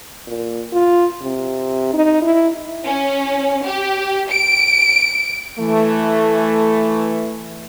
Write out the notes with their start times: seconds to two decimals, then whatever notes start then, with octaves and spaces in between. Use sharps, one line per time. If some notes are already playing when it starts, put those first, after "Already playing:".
0.27 A#2
0.72 F4
1.21 C3
1.93 D#4
2.22 E4
2.84 C#4
3.66 G4
4.30 D7
5.59 E3 A3